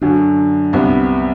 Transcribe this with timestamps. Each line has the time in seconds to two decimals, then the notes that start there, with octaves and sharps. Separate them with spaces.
0.02 F#2 D3 F#3 D4
0.73 C2 C3 G3 B3